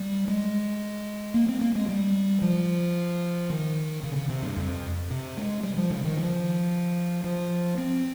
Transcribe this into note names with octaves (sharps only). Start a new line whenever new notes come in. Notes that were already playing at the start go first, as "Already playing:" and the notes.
Already playing: G3
G#3
A#3
C4
A#3
G#3
G3
F3
D#3
C#3
C#3
C3
G2
F2
C3
G#3
G3
F3
C#3
D#3
F3
F3
C4